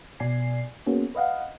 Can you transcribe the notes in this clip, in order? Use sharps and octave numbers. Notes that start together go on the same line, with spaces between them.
B2 D5 G#5 C7
A#3 B3 C#4 F#4 G#4
B4 D#5 F5 F#5